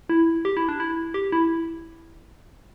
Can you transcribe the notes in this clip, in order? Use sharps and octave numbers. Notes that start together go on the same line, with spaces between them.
E4
G4
E4
D4
E4
G4
E4